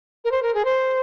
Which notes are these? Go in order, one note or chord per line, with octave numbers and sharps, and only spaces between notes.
A#4
C5
A#4
G#4
C5